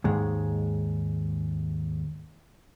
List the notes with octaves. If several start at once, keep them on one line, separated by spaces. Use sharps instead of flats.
D#2 G#2 G#3